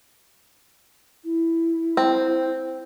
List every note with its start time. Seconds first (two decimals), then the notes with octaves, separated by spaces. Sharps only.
1.25 E4
1.97 C4